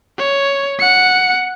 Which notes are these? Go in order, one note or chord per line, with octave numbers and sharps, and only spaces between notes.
C#5
F#5 C#7